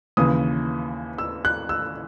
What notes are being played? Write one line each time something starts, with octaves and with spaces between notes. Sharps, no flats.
D#2 C#3 E3 D#6
E6
F#6
E6